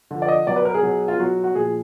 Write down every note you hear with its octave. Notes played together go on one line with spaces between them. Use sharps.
D3 F3
D5
D#5
B2 F#3 D5
B4
A#4
G#4
B2 F#3
F4
B2 F#3 F#4
F#4
A#2 F3 G#4